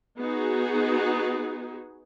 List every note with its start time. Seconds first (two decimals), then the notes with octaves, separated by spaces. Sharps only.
0.20 B3 D#4 F#4 G#4